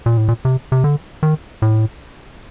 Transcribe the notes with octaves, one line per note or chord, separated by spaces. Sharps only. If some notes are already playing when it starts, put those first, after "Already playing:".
A#2
A2
A#2
C3
C3
D3
D#3
A2